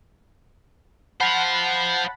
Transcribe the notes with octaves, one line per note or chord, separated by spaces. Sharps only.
C5 F5 F#5 A5 B5